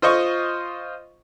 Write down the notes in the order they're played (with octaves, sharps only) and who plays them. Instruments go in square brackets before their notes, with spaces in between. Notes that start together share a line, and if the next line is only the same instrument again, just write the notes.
[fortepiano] F4 C5 D#5 C#6